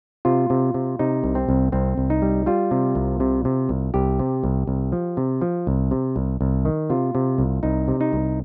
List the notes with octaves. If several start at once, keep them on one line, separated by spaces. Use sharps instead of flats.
C3 F4
C3
C3
C3 D#4
C2
C4
C2
C2 C4
C2
D#4
G3
G3 F4
C3
C2
C3
C3
C2
C2 G4
C3
C2
C2
F3
C3
F3
C2
C3
C2
C2
D#3
C3 F4
C3
C2
C2 D#4
C3
D#4
C2